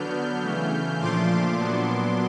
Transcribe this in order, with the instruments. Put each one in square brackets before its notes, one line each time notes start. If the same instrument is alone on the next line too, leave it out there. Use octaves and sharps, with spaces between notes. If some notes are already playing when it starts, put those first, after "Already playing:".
Already playing: [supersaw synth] D3 F#3 B3 D4 F6 G6
C#3 E3 A3
A#2 F3 A3 D4 F4 C6 D6
A#2 F#3 B3 D4